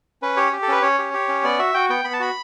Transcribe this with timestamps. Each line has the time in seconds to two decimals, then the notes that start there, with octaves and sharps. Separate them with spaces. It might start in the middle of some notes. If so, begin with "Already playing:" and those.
0.22 C#4 B4
0.37 G4 C#5
0.52 G4
0.62 A4
0.68 C#4 B4
0.82 C#4 C#5
0.99 G4
1.14 G4
1.28 C#4
1.43 B3 D5
1.59 F#4 E5
1.74 F#4 G5
1.90 B3 G5
2.04 B3 B5
2.13 A5
2.20 F#4 B5